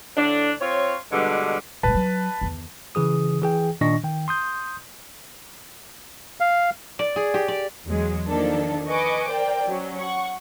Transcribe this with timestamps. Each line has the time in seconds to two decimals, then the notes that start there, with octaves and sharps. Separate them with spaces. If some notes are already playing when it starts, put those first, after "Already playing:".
0.17 A2 D3 D4
0.61 C4 F4 C#5
1.12 G2 B2 D3 G3 G#3
1.83 A#2 G#3 B4 A5
1.95 F#3
2.41 E2 D#3
2.95 C#3 E3 G#4 D#6
3.42 E3 G#4 G5
3.81 A#2 D#3 D4 D#5 C#6 A#6
4.04 D#3 G5
4.28 C6 D#6 G6
6.40 F5
6.99 D5
7.16 G#4
7.34 G4
7.48 D5
7.85 E2 F#3 G#3
8.27 D#3 F3 A#3 D4 A4
8.86 B4 D#5 G#5 C#6 D6
9.29 A#4 C5 D5 G5
9.67 F#3 C#4
9.99 F#5 C#6